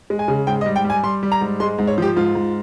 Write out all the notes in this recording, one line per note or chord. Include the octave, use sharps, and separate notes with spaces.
G#3
G#5
C#3
G#2 G5
D#5
G3
G5
G3
G#5
G3 C6
G3
A#5
G#2
G#3 C6
G#2
C#5
F3 G4
G#2 F4
G#2